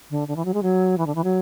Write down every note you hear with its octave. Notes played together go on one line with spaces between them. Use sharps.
D3
D3
E3
F#3
G#3
F#3
E3
D3
E3
F#3